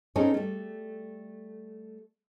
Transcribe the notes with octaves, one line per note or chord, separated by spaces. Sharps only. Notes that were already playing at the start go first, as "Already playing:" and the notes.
C4 C#4 D#4 G#4 A4 C#5
G3 A3